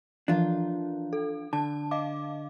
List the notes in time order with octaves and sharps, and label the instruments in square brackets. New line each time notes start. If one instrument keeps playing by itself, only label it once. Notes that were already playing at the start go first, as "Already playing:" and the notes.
[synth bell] E3 F3 [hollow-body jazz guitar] D4 F4
[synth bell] A4
[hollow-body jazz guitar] D3 [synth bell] A5
[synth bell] D#5 F5 D6